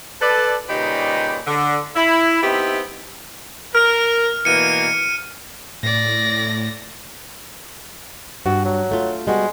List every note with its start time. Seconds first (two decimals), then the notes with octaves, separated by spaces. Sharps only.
0.22 A4 B4 D5
0.69 A#2 C#3 G3 D#4 G4 B4
1.46 D3
1.96 E4
2.43 B3 C4 D#4 E4 G4
3.75 A#4 F6
4.45 B2 E3 A#3 C#7 D#7
5.83 A2 D5 A#6
8.46 G2 F#4
8.65 F#3
8.91 A3 F4
9.27 G3 G#3 B3 F#4